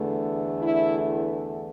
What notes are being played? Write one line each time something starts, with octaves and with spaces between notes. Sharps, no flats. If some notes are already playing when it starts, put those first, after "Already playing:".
Already playing: E2 D3 A3
E4